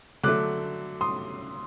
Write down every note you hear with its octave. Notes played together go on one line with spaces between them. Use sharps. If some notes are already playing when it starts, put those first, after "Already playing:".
D3 F#3 A3 D6 F#6
C6 D#6